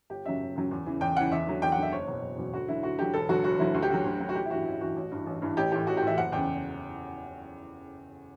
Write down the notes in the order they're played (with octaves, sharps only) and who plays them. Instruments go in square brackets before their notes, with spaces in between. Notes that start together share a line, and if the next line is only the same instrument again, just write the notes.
[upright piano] G1 G4
F#2 C#3 F#3 E5
G1
F#2 C#3 F#3
E2
C#3 E3
E2 G5
C#3 E3 F#5
E2 E5
D3 F#3
E2 G5
F#5
D3 F#3
E5
F#1 C#5
E2 B2 F#3
F#1
E2 B2 F#3
D2 F#4
D3 F#3 E4
D2 F#4
D3 F#3 G4
E1 A4
D2 D3 F#3 F#4
E1 F#4
D2 D3 F#3 E4
D2 F#4
G4
D3 F#3 F#4
D2
D3 F#3
F#4
A1 G4
E4
G2 E3 F#4
A1 E4
G2 E3 F#4
A1
G2 E3
A1
G2 E3
A1 G4
A2 E3 G4
A1 F#4
G4
A2 E3 E5
F#1 F#5
E2 C#3 G5
F#1